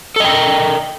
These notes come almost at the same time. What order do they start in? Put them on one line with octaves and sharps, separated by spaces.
A4 D#5 G5 A#4